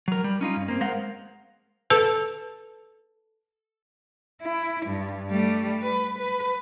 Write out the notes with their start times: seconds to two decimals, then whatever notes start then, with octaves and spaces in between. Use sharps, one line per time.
0.08 F#3 A#4
0.24 G3
0.41 C#4 D#4 F4
0.56 G2
0.68 A#3 C4
0.81 G#3 A#4 C5 F5 F#5
1.90 A4 B4 A5
4.42 E4
4.86 G2
5.29 G3 A3
5.82 B4
6.18 B4